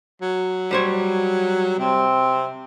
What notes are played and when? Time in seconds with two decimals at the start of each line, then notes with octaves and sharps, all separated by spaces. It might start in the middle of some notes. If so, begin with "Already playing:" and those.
0.22 F#3
0.71 G3 C5 C#5
1.78 C3 C4